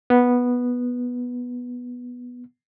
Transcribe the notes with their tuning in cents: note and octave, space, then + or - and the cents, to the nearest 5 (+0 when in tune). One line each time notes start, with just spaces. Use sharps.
B3 -5